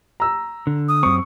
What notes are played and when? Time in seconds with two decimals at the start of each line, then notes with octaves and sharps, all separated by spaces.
0.20 A#5 E6
0.67 D3
0.89 D#6
1.03 F#2 C4 C#6